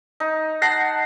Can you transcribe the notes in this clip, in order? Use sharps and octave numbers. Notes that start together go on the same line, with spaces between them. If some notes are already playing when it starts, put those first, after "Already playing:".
D#4
F#5 A5 A#6 C7